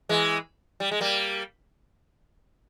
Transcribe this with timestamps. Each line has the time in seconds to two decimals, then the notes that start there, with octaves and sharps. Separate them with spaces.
0.09 E3 G#3
0.80 G3
0.91 G#3
1.00 G3 A#3